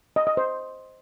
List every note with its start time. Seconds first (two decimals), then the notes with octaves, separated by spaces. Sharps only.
0.16 D#5
0.27 D#5
0.37 C5